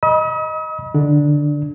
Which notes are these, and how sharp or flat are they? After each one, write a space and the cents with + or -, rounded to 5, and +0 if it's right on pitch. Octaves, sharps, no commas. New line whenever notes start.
D#5 +0 B5 -35 D#6 +45
D3 +0 D4 +0